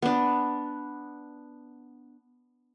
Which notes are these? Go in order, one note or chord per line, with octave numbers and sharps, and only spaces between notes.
B3 D4